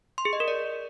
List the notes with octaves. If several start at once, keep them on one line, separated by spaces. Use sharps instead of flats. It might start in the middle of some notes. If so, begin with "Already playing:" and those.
C6
G#4
D#5
A#4
D5